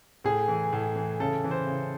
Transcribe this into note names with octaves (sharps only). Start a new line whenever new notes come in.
A2 G#4
E3
A2
E3
C#3 A4
E3
C5
C#3